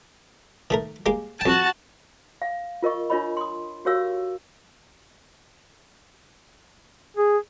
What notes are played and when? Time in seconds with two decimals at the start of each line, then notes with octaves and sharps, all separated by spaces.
0.70 D#3 A3 A#4
1.06 G#3 A#3 G4
1.41 F2 F#4 G5 A5
2.42 F5
2.82 F4 A#4 D#5 C#6
3.10 D4 F4 A#4 C#5 D#5 B5
3.37 C6 D#6
3.85 F#4 G4 A#4 C#5 F5 E6
7.17 G#4